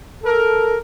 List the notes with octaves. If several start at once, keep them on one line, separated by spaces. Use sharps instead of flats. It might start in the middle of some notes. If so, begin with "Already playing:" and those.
A4 A#4